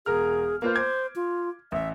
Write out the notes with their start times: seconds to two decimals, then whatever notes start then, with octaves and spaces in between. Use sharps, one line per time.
0.06 E1 G#4 A#4 F6
0.62 A#3 F4 B4 C5
0.75 C5 D6 G#6
1.16 F4
1.72 A1 E5